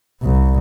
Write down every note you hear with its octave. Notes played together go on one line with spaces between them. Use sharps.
C2